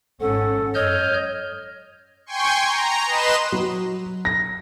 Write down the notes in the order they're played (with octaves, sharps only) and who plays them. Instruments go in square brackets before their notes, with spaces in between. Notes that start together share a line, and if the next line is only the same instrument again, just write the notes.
[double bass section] G#1 G#2 C#4 [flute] A4 [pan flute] F#5
[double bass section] F#2 [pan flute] C#5 [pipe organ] D#5 F6 G6
[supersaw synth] G5 G#5 C6 C#6
A#5
B4 D#5 C6 E7
[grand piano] F#3
A#6